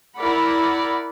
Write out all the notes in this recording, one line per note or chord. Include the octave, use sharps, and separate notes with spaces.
E4 A#4 D5 F#5 B5